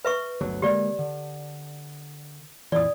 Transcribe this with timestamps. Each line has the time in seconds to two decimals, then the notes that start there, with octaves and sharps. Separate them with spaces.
0.05 B4 E5 C#6
0.41 G1 D2 F#3
0.62 D3 G#3 A#3 G4 D5
0.99 D3
2.72 F2 A#2 E3 D5 D#6